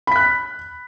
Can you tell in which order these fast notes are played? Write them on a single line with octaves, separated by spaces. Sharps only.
B5 B6 F#6